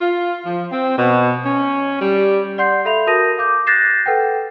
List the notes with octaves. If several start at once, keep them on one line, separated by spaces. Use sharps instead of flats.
F4
F3
C4
B2
C#4
G3
D5 F#5 C6 G6 C7
A4 E5 F5 B5 G6 F7
F#4 A#4 A5 D#6 A#6 D#7
F5 D6 G6
F#6 G6 A6 A#6 C7 E7
A4 B4 F#5 G5